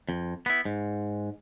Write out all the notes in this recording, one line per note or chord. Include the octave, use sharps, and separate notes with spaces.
F2
B3 E4
G#2